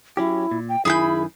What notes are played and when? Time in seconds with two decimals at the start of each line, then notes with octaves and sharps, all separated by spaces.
0.17 F#3 C#4 E4 G4
0.51 A#2
0.69 G5
0.85 F#2 D#3 E4 G#4 G#5 B5 G6